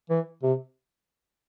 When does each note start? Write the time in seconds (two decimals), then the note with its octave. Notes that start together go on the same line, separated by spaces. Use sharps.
0.10 E3
0.43 C3